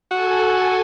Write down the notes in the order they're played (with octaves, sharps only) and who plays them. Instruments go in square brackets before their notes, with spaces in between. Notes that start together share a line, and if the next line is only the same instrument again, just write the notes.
[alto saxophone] F#4 [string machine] A4 G#5